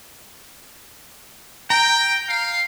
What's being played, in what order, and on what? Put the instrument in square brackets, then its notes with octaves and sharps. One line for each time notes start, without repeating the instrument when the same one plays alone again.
[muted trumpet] G5 [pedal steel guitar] A#5
[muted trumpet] F5